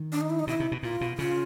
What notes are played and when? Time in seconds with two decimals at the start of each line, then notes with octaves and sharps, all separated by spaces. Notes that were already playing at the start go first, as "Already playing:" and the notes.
Already playing: D#3
0.12 D4
0.21 D#4
0.30 E4
0.39 D#4
0.47 B2 E4
0.60 C3
0.72 B2
0.82 A#2 F4
1.01 B2
1.18 C#3 F4